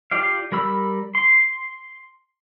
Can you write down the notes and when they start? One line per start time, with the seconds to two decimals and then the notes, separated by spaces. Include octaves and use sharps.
0.11 F4 G4 D5 F5
0.52 G3 A#4 B5 E6
1.15 C6